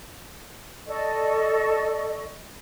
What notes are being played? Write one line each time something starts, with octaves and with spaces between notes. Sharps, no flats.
A4 D5 D#5 C#6